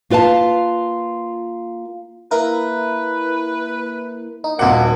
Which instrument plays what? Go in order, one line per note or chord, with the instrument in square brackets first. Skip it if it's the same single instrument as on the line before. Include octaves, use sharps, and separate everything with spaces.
[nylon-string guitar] A#3 F4 B4 F5 A5
[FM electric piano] A#3 E4 A#4 [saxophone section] B4
[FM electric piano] D#4
[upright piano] D#1 F#5 [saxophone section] D#3 A#3 F#4 [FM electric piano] D#4 F4 D5